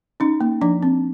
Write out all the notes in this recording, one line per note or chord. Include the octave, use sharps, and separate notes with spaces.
C#4 D#4
A#3
F3 D4
C4